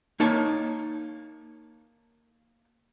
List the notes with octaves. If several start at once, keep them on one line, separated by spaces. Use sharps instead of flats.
A#3 D#4 C#5 A5